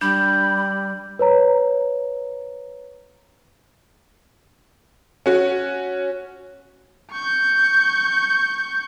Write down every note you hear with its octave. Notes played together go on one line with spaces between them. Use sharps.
G3 D4 B5 G6
B4 C#5 A#5
C#4 F#4
C#6 G6